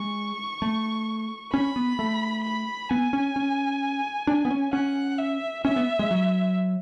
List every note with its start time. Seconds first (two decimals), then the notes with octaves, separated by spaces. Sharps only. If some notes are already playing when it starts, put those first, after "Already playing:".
Already playing: G#3 C#6
0.62 A3
1.53 C#4 B5
1.76 B3
1.99 A3
2.44 B5
2.90 B3 G#5
3.13 C#4
3.36 C#4
4.27 D4
4.45 B3
4.50 C#4
4.73 C#4 F#5
5.18 E5
5.64 C#4 E5
5.76 B3
5.99 G#3
6.11 F#3